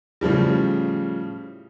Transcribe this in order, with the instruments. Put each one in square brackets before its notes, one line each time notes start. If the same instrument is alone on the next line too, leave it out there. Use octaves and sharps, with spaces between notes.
[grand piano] A2 C#3 F3 G3